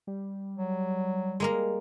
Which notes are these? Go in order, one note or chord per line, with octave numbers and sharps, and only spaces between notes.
G3
F#3
G#3 A#3 A#4